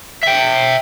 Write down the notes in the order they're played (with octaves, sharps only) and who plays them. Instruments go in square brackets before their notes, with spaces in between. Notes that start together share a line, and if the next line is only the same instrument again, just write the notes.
[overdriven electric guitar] E5 G5